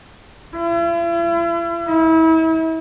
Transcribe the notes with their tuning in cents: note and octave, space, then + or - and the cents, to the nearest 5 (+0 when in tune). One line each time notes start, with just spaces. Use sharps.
E4 +45
E4 -35